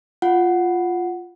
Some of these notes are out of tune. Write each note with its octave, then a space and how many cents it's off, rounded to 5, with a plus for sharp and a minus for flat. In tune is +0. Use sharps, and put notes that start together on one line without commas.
F4 +0 F#5 +0